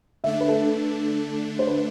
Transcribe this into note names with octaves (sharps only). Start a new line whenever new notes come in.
D3 A3 D4 E5
B4
A4
C5
B4